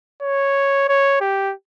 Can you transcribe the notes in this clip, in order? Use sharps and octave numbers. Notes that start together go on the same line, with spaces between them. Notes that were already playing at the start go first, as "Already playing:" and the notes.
C#5
C#5
G4